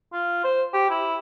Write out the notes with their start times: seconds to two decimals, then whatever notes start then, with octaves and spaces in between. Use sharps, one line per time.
0.13 F4
0.44 C5
0.74 G4
0.90 E4